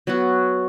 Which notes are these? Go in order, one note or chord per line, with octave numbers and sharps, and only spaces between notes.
F#3 B3 F#4